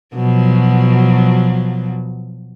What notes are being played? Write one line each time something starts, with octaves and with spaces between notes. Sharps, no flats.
B2 F3 F#3